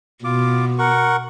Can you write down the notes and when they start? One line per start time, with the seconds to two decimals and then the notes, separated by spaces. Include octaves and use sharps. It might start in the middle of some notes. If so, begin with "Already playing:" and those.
0.24 B2 F4 D6
0.79 A#4 F#5 C#6